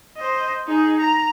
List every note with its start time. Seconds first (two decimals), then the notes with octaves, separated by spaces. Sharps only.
0.17 C5 D#5
0.67 D#4 G#4
1.00 A#5